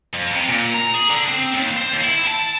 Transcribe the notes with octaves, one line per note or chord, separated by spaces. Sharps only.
F2
C3
A#2
A#5
G#4
D3
C4
D#2
C5
D#2
E4
A5